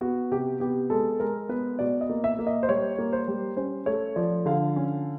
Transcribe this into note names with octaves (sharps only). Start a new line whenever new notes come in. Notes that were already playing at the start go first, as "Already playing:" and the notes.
B3 F#4
C3 G4
B3 G4
G#3 A4
G#3 A#4
B3 B4
B2 D5
D#5
A#3
E5
A#3
D#5
C5
G3 C#5
A#3
C5
G3
C#4 C5
A3 C#5
F3 D5
D3 F5
C#4